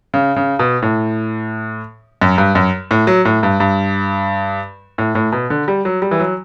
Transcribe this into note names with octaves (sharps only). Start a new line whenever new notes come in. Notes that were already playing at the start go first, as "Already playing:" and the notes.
C#3
C#3
B2
A2
F#2
G2
F#2
A2
F#3
A2
G2
G2
A2
A2
B2
D3
G3
F#3
G3
E3
F#3